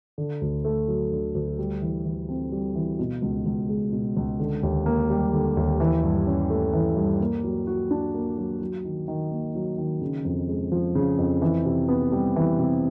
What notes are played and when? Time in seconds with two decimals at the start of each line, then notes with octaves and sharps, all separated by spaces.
0.18 D3
0.41 D2
0.65 A3
0.88 F#3
1.12 D3
1.35 D2
1.59 G3
1.81 E3
2.05 E3
2.29 C4
2.52 G3
2.75 E3
2.99 B2
3.22 C#2
3.46 C#2
3.69 G#3
3.92 B2
4.16 C#2
4.39 D3
4.63 D#2
4.86 A#3
5.10 G3
5.33 D3
5.57 D#2
5.80 E3
6.03 G2
6.27 C#4
6.50 A3
6.73 E3
6.97 G2
7.20 A#3
7.44 F#3
7.67 F#4
7.91 D4
8.14 A#3
8.37 F#3
8.61 F#3
8.84 D#3
9.08 D#3
9.31 A#3
9.55 F#3
9.78 D#3
10.01 C#3
10.25 F2
10.49 G#3
10.72 F3
10.95 C#3
11.18 F2
11.42 E3
11.65 C3
11.88 B3
12.12 G3
12.36 E3
12.59 C3